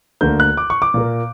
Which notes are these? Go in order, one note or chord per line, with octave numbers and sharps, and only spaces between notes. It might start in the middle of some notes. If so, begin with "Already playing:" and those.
D2 D3 A#3 G6
F#6
D6
C#6
D6
A#2 A#3